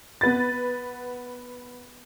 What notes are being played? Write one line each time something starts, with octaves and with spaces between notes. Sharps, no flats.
B3 B4 A6